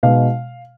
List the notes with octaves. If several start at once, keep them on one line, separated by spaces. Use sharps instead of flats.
B2 G#3 B3 D#4 F5